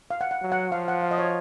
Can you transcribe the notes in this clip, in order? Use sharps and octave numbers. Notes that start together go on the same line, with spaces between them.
F5
F#5
F#5
F#3
F#5
F3 F5
F#5
F5
D#5
C#5